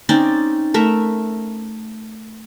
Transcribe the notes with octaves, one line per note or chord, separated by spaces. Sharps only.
C4 C#4 D#4 D5
A3 A#4 E5